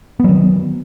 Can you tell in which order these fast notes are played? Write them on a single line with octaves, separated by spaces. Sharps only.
B3 F#3 D#3